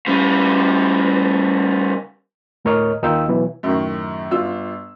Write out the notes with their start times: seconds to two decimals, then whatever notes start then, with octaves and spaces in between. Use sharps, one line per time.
0.07 C#3 G3
2.65 D2 A2 A#4 C#5 D#5 F6
3.02 D#2 D#3 D#4 F4 G5 E6
3.28 B2 E3 F#3
3.63 F#2 A2 D#3
4.31 G1 F4 E6